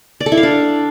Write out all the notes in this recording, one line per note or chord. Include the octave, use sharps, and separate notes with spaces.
D5
A4
E4
F5
D4